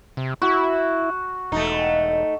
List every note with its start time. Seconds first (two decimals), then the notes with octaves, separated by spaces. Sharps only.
0.17 C3
0.42 E4 F#4
1.52 E1 A3 D#4